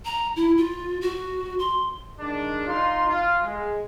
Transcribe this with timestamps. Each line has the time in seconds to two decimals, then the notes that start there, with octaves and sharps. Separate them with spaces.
0.05 A#5
0.36 E4
0.57 F4
1.01 F#4
1.59 C6
2.19 D#3 G#3 D4
2.67 D#4 F4 C6
3.08 F4
3.42 G#3